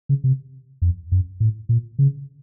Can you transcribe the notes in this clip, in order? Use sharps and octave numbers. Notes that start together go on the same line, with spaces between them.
C#3
C3
F2
F#2
A2
A#2
C#3